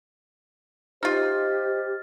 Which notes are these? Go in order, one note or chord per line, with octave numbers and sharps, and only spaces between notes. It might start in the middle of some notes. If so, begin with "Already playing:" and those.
D#4 F4 G4 C5 D#5 F6 A6